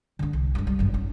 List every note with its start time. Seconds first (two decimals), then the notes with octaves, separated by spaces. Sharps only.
0.19 D3 D4
0.33 C2
0.55 G2 F3
0.67 G3
0.79 G#1 F#2
0.94 C#4 D#4